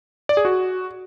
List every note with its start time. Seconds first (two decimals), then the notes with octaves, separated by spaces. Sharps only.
0.29 D5
0.37 G#4
0.45 F#4